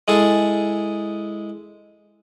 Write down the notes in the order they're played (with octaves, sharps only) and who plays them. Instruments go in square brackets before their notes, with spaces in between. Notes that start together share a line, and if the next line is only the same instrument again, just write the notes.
[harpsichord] G#3 E4 G#4 A4